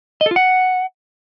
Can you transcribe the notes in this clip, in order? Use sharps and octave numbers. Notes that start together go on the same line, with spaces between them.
D#5
A4
F4
F#5